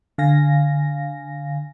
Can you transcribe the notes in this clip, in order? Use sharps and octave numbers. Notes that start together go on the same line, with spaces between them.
D3 F5 G#5 A#6